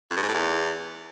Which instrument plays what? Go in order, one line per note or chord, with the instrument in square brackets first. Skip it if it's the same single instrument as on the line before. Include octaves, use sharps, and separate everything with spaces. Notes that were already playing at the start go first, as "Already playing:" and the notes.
[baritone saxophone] F2
G2
G#2
A2
E2